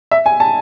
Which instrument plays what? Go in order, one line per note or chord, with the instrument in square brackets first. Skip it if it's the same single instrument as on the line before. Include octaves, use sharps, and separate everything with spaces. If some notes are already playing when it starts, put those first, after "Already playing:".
[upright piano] E5
G#5
A5